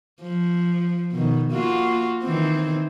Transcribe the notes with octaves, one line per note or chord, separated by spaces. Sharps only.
F3
B2 D#3
A#3 F4 F#4
D#3 E3 C4